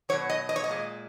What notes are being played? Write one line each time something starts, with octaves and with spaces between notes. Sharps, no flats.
B2 F#3 C#5
D#5
D#5
C#5
D#5
A#2 G#3